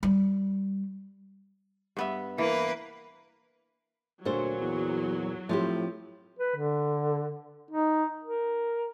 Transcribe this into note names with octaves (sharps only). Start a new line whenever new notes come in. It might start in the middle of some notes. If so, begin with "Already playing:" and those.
G3
G2 B3 E5
E3 A#3 B4
D2 A#2 F#3 A4 C5
E2
A2 F3 C4 G4
B4
D3
D#4
A#4